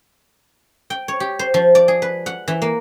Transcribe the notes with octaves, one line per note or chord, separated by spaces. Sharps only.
G5
C#5
G4
C5
F3
D5
G#4
B4
F#5
E3
A#3